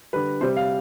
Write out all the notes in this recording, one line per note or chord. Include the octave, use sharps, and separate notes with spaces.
D3 G3 B4
C3 G3 C5
F5